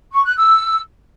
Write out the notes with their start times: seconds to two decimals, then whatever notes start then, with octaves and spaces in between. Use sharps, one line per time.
0.13 C#6
0.25 F#6
0.36 E6